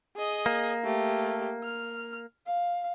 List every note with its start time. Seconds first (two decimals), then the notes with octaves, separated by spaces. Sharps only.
0.16 G#4 D#5
0.46 A#3
0.84 A3 G4
1.63 F6
2.46 F5